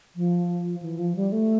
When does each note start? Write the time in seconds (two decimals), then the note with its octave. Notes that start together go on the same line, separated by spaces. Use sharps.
0.16 F3
0.82 E3
0.99 F3
1.16 G3
1.32 A3